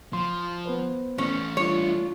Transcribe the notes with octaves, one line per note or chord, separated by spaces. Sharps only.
F3 C6
B3 B4 C5
E3 A3 C#4
G3 D4 F4 C#5